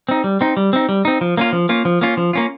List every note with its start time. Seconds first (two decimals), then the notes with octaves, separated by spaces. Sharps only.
0.09 C4 D#4
0.24 G3
0.41 C4 D#4
0.57 G3
0.73 C4 D#4
0.89 G3
1.05 C4 D#4
1.21 F3
1.37 A#3 C#4 F4
1.53 F3
1.69 A#3 C#4 F4
1.85 F3
2.01 A#3 C#4 F4
2.17 F3
2.33 A#3 C#4 F4